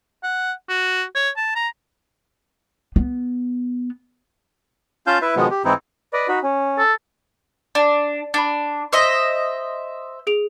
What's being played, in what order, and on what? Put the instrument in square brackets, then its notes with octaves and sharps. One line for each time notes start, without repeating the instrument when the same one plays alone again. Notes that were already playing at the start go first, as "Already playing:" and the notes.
[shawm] F#5
F#4
C#5
A5
A#5
[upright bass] B3
[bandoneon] C#4 F4 F5 A5 G6
E4 B4 E5
B2 D#3 F3 G#3 B3
G4
G#2 E3 C4 D#4 E4
[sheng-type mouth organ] B4 D5 D#5
D#4 F#4 B5
C#4
[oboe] A4
[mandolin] D4 [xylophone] D5 A5
[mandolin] D4 [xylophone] B5 A6
[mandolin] C5 D#5 E5
[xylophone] G#4 D7 F7